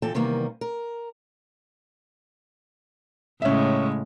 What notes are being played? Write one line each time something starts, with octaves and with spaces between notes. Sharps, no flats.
A#2 E3 A4 G5 A5
C3 D#3 E3 G3 A#3 B3
A#4
A2 C#3 G#3 C#4 E5